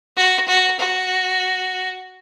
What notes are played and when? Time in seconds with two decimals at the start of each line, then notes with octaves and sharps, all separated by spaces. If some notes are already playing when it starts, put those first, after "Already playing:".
0.17 F#4
0.48 F#4
0.79 F#4